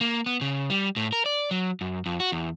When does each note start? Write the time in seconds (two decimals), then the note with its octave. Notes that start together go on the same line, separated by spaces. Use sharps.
0.01 A#3
0.26 B3
0.41 C#3
0.70 G3
0.96 A2
1.13 A#4
1.26 D5
1.51 F#3
1.81 F#2
2.06 F2
2.20 F#4
2.32 E2